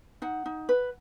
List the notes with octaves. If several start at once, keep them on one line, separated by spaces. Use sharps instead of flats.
D#4 F#5
D#4
B4